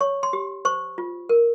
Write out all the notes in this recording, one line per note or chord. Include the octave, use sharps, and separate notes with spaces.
C#5 C#6
C6
G4
C5 C#6
F4
A#4